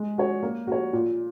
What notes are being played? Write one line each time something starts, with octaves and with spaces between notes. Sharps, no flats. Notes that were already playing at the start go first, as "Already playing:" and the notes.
Already playing: G#3
F#4 C#5
A#3
F#4 C#5
A#2